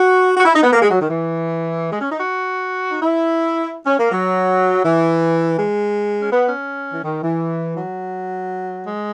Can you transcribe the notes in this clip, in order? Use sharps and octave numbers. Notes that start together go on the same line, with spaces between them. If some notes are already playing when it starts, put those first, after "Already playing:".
Already playing: F#4
F#4
E4
D#4
B3
A#3
G#3
F#3
D#3
E3
G#3
C#4
D#4
F#4
D#4
E4
C#4
A#3
F#3
E3
G#3
C#4
B3
C#4
E3
D#3
E3
F#3
G#3